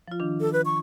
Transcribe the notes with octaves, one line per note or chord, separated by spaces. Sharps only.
F3 F4
D#3 D4
A4
B4
C#6